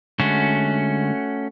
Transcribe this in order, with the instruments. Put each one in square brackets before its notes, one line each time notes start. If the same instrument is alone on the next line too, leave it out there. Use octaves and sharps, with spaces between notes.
[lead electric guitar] D3 G#3 [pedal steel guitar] A3 C#4 F#4